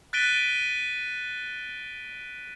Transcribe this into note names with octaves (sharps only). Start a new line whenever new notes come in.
F#6 A6 B6 D7 D#7 G7